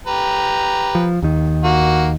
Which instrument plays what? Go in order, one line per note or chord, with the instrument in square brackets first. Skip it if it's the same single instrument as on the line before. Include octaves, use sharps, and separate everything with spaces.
[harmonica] G4 B4 A#5
[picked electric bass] F3
D#2 D#3
[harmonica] A#3 F#4